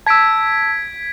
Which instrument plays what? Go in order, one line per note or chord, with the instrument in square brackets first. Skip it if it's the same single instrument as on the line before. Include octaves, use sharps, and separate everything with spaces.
[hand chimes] A5 E6 [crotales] G#6 B6 D7